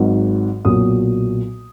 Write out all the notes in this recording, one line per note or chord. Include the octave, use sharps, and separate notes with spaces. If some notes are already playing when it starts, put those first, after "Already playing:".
Already playing: G#1 G#2 F#3
B1 A#2 F#3 D#6